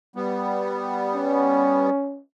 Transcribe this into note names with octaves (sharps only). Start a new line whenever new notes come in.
G3 B3
C#4